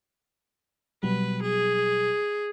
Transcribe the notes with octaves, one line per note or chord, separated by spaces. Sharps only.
B2 F#3 G3 B4
G#4